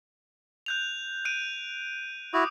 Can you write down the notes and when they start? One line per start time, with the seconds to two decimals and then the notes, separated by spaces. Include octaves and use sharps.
0.66 F#6 G6 F7
1.25 F#6 D7 D#7
2.34 E4 F#4 D6 D#6